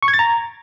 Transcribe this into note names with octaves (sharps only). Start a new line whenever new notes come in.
C#6
G#6
A6
A#5